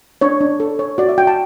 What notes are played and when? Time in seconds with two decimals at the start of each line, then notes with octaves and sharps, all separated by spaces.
0.21 D4 C#5
0.41 D4
0.60 A4
0.79 C#5
0.98 F#4 D5
1.09 E5
1.18 F#4 G5
1.27 A5